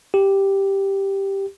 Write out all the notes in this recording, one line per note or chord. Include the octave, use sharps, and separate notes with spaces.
G4